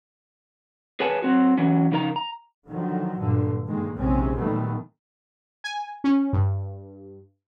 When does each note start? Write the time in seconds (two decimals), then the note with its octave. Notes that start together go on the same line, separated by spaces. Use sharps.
1.00 G#4 A#4 B4 C#5 G#5 A5
1.22 F#3 C4 F#4
1.57 E3 F#3 C#4
1.92 C#3 F3 D#4 A#4 D5 A#5
2.16 A#5
2.68 D3 D#3 F3 F#3
3.19 G2 A#2 D3
3.68 G2 D#3 G#3 A#3
3.97 A#1 D#2 C3 G#3 C4 C#4
4.37 A#2 D#3 F#3 G3 A3 B3
5.64 G#5
6.04 C#4
6.33 G2